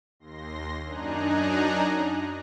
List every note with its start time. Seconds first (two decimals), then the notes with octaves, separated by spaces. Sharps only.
0.20 D#2 C6 A#6
0.85 F#2 D4 D#4 G#5 A#5 F#6